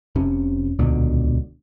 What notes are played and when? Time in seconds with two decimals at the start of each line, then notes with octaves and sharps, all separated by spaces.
0.16 F1 C3 C#4
0.79 D#1 C#2 B2 D3